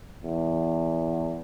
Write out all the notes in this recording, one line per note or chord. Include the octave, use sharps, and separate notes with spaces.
E2